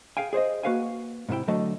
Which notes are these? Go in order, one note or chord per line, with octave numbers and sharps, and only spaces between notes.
G#4 F5 G5 G#5
G#4 C5 C#5 D#5
A#3 F#4 B4 F5 F#5 G#5
G#2 C3 F#3 E4 G5
D3 F#3 A3 D#5 A5